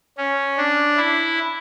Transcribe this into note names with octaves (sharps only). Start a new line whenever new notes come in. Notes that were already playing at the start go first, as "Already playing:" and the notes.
C#4
D4
E4